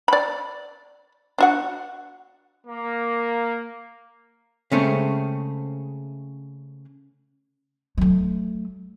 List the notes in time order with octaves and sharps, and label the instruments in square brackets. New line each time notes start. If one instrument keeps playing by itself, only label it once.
[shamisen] D5 B5
D4 F#4 F#5
[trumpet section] A#3
[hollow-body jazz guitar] C#3 G#3 A3 C4 C#4
[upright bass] F#3 A3